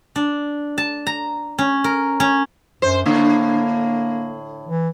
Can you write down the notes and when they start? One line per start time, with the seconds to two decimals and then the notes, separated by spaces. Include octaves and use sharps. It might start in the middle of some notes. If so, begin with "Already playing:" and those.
0.16 D4
0.78 A5
1.07 A#5
1.59 C#4
1.84 A#4
2.20 C#4
2.82 F#2 C5
3.06 A2 D3 A#3
4.67 E3